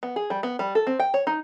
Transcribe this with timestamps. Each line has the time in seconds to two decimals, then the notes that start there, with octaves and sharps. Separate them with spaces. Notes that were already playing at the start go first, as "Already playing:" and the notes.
0.03 B3
0.16 G#4
0.30 G3
0.43 B3
0.59 G3
0.75 A4
0.87 C4
1.00 G5
1.14 C#5
1.27 D#4